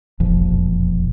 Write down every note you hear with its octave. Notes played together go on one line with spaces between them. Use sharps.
E1 A#1 F2 F3